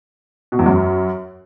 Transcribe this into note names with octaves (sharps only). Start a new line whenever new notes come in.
B2
E2
F#2